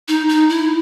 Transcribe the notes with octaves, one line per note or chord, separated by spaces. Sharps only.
D#4
D#4
E4